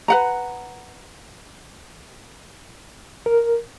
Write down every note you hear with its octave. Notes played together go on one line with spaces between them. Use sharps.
B4 F#5 A#5
A#4